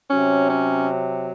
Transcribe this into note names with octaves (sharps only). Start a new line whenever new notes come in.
C3 F#3 C#4
C#4